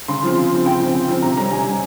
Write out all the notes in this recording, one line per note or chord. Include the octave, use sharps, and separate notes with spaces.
C#3 C6
F3 C4
C#3
F3 C4
C#3 G5
F3 C4
C#3
F3 C4
C3 A#5
G3 C#4 A#5
C3 G#5
G3 C#4